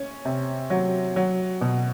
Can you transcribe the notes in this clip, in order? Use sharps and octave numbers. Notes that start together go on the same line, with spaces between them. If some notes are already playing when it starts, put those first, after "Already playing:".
Already playing: C#4
C3
F#3
F#3
B2